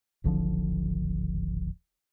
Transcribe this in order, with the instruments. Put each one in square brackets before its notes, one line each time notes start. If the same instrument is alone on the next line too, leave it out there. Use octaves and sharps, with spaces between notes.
[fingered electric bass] D1 G#1 D3 F3